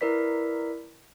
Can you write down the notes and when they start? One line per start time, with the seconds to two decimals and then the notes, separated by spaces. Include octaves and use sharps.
0.01 E4 A#4 B4 D5 B6